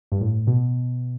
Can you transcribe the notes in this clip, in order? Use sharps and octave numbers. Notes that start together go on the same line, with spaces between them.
G2
A2
B2